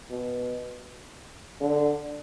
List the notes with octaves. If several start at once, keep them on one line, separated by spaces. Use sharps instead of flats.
B2
D3